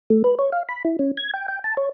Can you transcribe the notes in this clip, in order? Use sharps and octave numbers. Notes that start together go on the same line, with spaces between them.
A3
B4
C#5
F5
B5
E4
C#4
G#6
G5
G5
A5
C#5